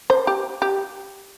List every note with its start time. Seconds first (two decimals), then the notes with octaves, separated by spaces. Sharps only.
0.10 C5
0.27 G4
0.62 G4